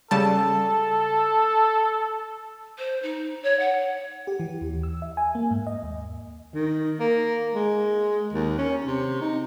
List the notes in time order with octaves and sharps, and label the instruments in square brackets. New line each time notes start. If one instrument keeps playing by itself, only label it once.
[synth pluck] C#3 G3 A5 [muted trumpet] A4
[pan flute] C5
D#4
C#5
F#5
[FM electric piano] G4
E3
D#2
E6
E5
G#5
A#3
G#2
D#5
D#2
[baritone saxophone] D#3
A#3
G#3
D#2
C#4
C3
D#4